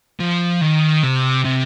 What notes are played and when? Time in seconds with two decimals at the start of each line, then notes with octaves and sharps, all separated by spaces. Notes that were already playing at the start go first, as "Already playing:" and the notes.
0.20 F3
0.61 D#3
1.03 C3
1.44 C3